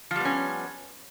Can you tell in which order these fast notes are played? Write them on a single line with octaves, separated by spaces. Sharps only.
F3 G3 B3 C#4